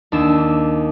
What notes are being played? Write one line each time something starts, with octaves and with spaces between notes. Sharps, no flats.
D#2 D4 E6 E7